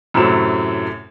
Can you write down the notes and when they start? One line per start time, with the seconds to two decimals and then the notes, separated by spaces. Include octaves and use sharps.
0.14 F#2 A2 C3 F#3 E7